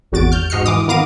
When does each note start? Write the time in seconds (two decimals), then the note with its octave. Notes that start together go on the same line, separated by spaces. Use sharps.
0.12 G#1 E2 F#4 A6 D7
0.32 F6 G6
0.50 G#2 F#4 D#5 F6 C7 C#7
0.66 E3 D6 D#6
0.88 D#3 B3 F5 A#5 D6 D#7